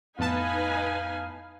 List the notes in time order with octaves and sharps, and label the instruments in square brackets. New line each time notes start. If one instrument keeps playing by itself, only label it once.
[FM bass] F2 [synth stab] A2 B3 A5 [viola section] D#4 B4 G#5 [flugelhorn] F5